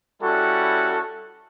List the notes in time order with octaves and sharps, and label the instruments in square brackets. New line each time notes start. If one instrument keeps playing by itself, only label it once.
[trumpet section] G3 C#4 E4 F#4 A4